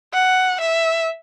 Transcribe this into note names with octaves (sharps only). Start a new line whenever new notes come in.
F#5
E5